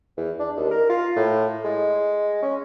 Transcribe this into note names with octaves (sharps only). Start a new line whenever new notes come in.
E2
D4
D#2
A#4
F4
A2
G#3
C#4